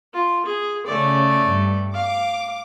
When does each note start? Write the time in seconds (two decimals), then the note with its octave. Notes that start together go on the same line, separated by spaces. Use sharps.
0.13 F4
0.45 G#4
0.86 C#3 A3 C#4 D5
1.44 G2
1.94 F5 D6